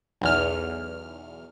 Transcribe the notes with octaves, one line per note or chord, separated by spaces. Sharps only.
B1 E2 F6